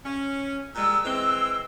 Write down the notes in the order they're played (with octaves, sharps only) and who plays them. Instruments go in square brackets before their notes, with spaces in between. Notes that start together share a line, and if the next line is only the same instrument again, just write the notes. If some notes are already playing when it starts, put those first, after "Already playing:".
[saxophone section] C#4
[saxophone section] A#2 G3 G#3 [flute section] E6
[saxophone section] E3 G#3 C4